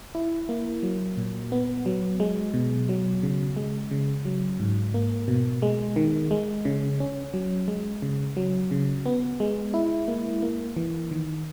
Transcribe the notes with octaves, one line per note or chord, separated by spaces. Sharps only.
E4
A#3
F#3
A#2
B3
F#3
G#3
B2
F#3
C#3
G#3
C#3
F#3
G#2
A#3
B2
G#3
D#3
G#3
C#3
C#4
F#3
G#3
C#3
F#3
C#3
B3
G#3
E4
A#3
A#3
E3
D#3